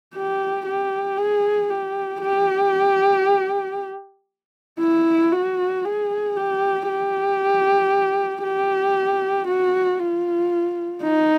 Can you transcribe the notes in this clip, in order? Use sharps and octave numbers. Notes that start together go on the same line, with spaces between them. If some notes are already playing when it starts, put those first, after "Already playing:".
G4
G4
G#4
G4
G4
E4
F#4
G#4
G4
G4
G4
F#4
F4
D#4